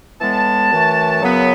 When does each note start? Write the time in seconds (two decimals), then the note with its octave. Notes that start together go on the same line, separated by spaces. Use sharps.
0.21 A2 E3 G#3 B3 A5
0.71 F#2 E3 A3
1.21 F#2 C#3 F#3 B3